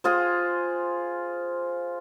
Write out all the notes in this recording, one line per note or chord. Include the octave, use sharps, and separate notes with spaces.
F4 G#4 C5